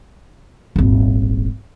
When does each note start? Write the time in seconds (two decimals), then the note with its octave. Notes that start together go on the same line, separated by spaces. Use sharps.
0.76 D#1 G#1